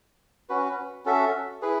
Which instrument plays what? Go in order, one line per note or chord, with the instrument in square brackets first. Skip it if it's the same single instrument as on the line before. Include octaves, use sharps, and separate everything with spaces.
[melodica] C#4 F#4 B4
C#4 F#4 A4 E5
E4 G#4 B4